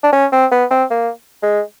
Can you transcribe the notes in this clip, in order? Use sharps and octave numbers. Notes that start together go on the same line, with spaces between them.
D4
C#4
C4
B3
C4
A#3
G#3